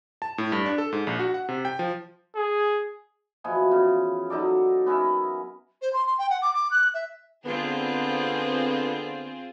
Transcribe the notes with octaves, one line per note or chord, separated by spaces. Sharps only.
A5
A2
G2
D4
A4
G#2
A#1
F#4
F#5
C3
G5
F3
G#4
B2 E3 F3 G#4
C#3
F#3 D#4 A4 D5
B3 C#4 A#4 E5
C5
C6
C6
G5
F#5
D6
D6
F#6
E5
D3 B3 C4 F4 G#4